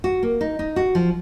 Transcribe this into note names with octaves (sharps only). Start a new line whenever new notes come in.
F#4
A#3
D#4
D#4
F#4
F3